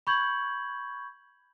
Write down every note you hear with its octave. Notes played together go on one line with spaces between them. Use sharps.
B5 C#6 G6 G#6 F#7